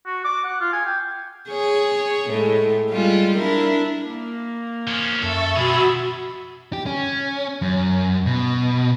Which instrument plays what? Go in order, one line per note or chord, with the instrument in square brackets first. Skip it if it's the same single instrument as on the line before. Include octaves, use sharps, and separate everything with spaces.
[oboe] F#4
D6
F#5
F4
G#5
G5
[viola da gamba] G#4 C#5
A2 G#3
G3 G#3 F4
D4 E4 A#4
[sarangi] A#3
[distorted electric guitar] F3 C#4
[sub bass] F#2 [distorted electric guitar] A4 [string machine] E5 C#6 A6
[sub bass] B2 [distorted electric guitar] F3 G#4 [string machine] F#4 E6 [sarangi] B5
[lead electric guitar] G4
C#4
F#2
B2